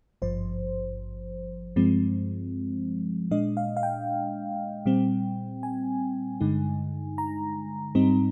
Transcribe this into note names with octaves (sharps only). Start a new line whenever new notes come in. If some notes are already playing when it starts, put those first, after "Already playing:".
G#1 G2 F3 C5
G2 F3 G#3 C4
A#2 G#3 D4 D#5
F5
F5
G5
A#2 G3 C4
G#5
G2 D3 G#3 D#4
A#5
G#2 G3 C4 D#4